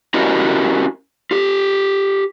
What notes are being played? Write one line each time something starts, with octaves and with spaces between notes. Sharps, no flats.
C#4 E4 F#4 G4 A#4 D#5
F4 G4